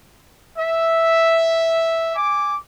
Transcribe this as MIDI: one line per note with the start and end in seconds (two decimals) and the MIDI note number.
0.58 2.10 76
2.15 2.57 80
2.15 2.57 86